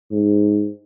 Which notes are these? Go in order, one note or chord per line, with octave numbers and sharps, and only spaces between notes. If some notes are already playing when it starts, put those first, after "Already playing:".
G#2